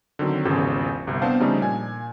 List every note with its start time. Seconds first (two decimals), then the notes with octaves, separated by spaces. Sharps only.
0.19 D3 D#3 F#3 C4
0.45 G#1 E2 C#3 F3 G4 A4
1.07 G1 C2 C3
1.22 B3 C4 D4 C5 F5 A5
1.40 C#3 F3 G3 A3 D4 D#4
1.62 A#2 G#5